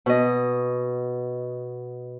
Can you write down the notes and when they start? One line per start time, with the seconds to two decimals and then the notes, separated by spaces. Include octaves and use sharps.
0.06 B2 D#5